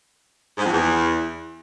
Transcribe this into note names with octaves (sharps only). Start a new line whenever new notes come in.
G#2
F2
E2